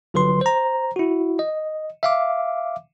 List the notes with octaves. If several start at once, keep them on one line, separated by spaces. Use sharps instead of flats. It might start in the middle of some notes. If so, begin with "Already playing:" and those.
G1 D3 F#3 B4 C6
C5 A#5
E4 F#4
D#5
E5 F5 D6